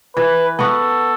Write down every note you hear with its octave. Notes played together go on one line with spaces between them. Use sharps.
E3 B4
B3 F#4 A4